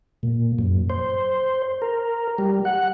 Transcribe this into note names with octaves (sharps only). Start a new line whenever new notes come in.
A#2
F#2
C5
A#4
G3
F#5